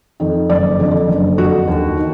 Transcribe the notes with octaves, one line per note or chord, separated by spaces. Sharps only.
F2 D#3
F#1 D5
F2 D3
F#1
F2 D3 F#4
D#2
D#3